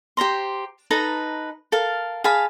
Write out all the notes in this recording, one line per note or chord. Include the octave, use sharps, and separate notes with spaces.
G4 C5 A#5 C6
D#4 A4 B4 A#5
A4 A#4 F5
G#4 F5 A5 B5